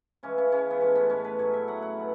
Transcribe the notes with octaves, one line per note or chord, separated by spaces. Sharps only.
C#3 E3 G#3 C#4
C#4
C#3 E3 G#3 C#4
B3
A2 G#3 C#4
B3
A2 G#3 C#4
B4
A2 F#3 C#5
E5
A2 F#3 F#5
F#5
B2 F#3